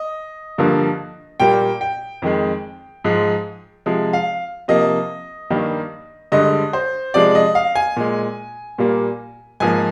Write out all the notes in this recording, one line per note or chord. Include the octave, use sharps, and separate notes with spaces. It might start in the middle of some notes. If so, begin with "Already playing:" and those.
Already playing: D#5
G2 D3 F3 A#3
A#2 G3 A#3 G5
G5
F2 D#3 G#3
G#2 F3 G#3
C3 F3 G#3
F5
C3 F3 A#3 D#5
G2 D#3 G3 A#3
G2 D3 G#3 D#5
C5
C3 F3 G#3 D5
D#5
F5
G#5
A#2 G#3
A#2 G3 A#3
G#2 F3 A#3 G#5